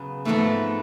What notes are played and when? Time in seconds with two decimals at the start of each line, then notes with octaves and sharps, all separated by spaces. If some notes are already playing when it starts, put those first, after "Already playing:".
Already playing: C#3 F#3 B3
0.25 G#2 F3 A3 B3